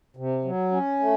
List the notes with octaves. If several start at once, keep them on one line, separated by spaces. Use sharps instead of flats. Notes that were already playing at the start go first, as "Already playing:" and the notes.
C3
F#3
C#4
A3